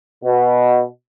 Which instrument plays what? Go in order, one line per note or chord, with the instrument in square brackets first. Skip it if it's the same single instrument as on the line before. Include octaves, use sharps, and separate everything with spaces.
[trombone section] B2